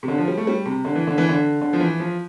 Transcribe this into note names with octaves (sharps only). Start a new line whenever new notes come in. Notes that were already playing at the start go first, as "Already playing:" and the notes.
C3
D3
F3
G3
A3
G3
C3
D3
E3
D3
E3
D3
D3
F3
E3
F3